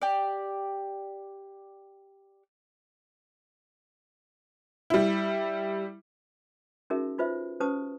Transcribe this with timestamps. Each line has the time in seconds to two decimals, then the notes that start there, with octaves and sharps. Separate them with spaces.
0.02 G4 D5
4.90 G3 E4
6.90 C#4 D#4 F#4 G#4 A#4 E5
7.18 D#4 F4 B4 C5 E5
7.60 C#4 G4 B4 C5 A5 D#6